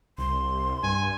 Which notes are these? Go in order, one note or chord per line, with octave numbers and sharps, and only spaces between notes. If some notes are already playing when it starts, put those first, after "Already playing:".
C2 C6
G2 G#5